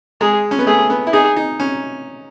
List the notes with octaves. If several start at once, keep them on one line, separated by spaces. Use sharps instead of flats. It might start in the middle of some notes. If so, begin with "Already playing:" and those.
G#3 G#4
C#4
B3
A3 G#4
B3
E4
D#4 G#4
D#4
C#4